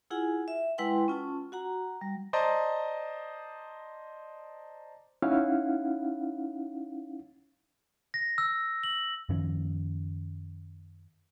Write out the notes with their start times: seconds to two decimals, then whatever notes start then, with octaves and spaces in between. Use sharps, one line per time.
0.10 E4 F4 G#4 F#5 G#5
0.48 E5
0.78 G#3 E4 B4 F#5 G5 C6
1.08 C#4 F4 A5
1.52 F#4 F#5 A#5
2.01 G3
2.33 C5 D5 D#5 A5 A#5
5.22 C#4 D#4 E4 F5 F#5
8.14 A#6
8.38 E6
8.83 F#7
9.29 F#2 D#3 F3 C#4